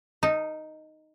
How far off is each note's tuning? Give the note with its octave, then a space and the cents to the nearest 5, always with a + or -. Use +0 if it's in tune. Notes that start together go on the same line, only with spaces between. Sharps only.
D#4 +0 A4 +45